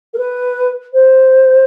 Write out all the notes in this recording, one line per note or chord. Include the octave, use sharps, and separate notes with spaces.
A#4
B4
C5